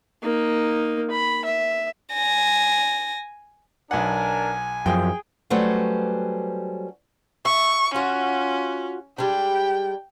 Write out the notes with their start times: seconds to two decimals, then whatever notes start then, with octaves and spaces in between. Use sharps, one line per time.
0.23 A#3 D#4
1.10 B5
1.45 E5
2.14 G#5 A#6
3.91 B1 D4 A#4 F#5 G#5
4.86 F#2 F3 G#4 G5
5.50 F#3 G3 A3 C#4 B4 C5
7.45 E5 C#6
7.94 C#4 F4 F#4
9.18 G3 G#3 D4 G5